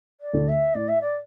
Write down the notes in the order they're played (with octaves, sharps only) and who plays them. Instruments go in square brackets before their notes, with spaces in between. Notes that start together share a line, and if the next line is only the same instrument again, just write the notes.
[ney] D5
[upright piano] D2 D3 A3 D4
[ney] E5
[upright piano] A2 [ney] D5
[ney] E5
D5